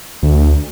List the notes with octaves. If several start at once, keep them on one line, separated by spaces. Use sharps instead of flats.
D2